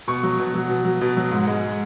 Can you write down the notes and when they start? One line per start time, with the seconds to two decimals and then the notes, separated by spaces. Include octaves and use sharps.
0.08 B2 C#6
0.23 F#3
0.39 B2
0.54 F#3
0.69 B2
0.85 F#3
1.01 B2
1.17 F#3
1.31 G#2
1.47 G#3